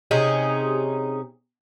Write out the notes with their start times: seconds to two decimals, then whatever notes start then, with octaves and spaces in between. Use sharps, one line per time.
0.11 C3 C#4 D#4 G#4